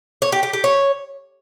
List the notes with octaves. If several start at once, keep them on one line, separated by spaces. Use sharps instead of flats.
C#5
G4
G4
G4
C#5